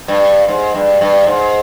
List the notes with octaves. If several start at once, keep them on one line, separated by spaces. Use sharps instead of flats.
G2
G#2
G2
G2
G#2